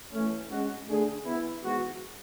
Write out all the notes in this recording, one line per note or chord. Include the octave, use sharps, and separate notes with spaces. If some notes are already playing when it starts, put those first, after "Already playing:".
E3 A3 C#4
G#3 C#4 F#4
D3 A3 D4 G#4
E3 B3 E4
G#2 E3 G#3 B3 F#4